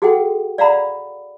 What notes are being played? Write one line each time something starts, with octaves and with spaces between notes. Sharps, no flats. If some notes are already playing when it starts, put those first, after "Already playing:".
F#4 G#4 A4 F#5 G5
D5 F5 F#5 A#5 B5